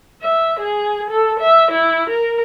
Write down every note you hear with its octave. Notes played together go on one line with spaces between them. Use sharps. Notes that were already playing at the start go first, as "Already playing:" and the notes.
E5
G#4
A4
E5
E4
A#4